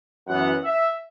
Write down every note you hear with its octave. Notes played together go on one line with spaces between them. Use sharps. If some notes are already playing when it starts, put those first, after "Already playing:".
F#2 E3 B3 F#5
E5